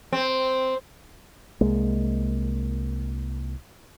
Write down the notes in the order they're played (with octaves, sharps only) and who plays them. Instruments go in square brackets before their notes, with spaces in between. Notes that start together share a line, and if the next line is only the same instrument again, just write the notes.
[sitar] C4
[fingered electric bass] C2 G#3 A#3